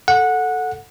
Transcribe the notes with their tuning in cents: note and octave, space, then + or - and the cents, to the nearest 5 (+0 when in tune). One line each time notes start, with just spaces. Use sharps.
A4 +5 F#5 -15